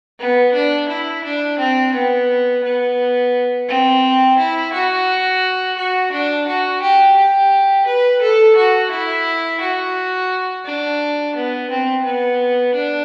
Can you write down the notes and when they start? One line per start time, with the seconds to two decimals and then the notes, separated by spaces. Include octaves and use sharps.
0.19 B3
0.54 D4
0.89 E4
1.24 D4
1.59 C4
1.94 B3
2.64 B3
3.68 C4
4.38 E4
4.73 F#4
5.77 F#4
6.12 D4
6.47 F#4
6.82 G4
7.17 G4
7.87 B4
8.22 A4
8.56 F#4
8.91 E4
9.61 F#4
10.65 D4
11.35 B3
11.70 C4
12.05 B3
12.74 D4